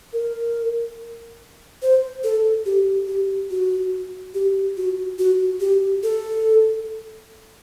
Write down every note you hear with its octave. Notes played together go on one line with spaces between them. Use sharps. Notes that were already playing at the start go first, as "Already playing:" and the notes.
A#4
C5
A4
G4
G4
F#4
G4
F#4
F#4
G4
A4